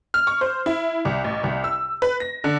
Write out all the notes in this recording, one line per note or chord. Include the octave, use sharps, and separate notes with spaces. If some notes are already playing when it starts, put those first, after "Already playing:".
F6
C#6
C5
E4
C2
A1
C2
E6
B4
A#6
D3